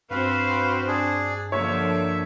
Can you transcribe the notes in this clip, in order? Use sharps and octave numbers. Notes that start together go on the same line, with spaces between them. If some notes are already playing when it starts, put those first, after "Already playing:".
G2 C4 F#4 B4 C5 F5
D4 G#4
D3 F3 A#3 C#5 E5